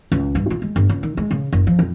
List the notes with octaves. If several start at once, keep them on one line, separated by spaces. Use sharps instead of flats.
C#2
G2
F4
G#3
G1
C#2
D#3
G#3
C#3
F#1
F3
F2